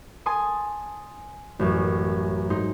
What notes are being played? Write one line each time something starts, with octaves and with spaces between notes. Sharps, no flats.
G#5 A5 C6 D#6
A1 F#2
G#2 D#4 C6